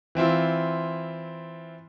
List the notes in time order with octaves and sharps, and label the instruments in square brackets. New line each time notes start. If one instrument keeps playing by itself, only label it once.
[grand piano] E3 C4 E4 F4